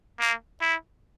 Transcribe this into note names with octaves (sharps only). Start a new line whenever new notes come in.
A#3
E4